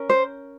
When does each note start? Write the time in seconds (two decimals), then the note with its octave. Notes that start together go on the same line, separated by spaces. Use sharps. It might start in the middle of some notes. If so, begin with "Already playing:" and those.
Already playing: C#4 A#4
0.10 C5